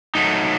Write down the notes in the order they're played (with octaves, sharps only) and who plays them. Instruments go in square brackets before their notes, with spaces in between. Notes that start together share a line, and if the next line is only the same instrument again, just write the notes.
[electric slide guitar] F#3 A3 D#4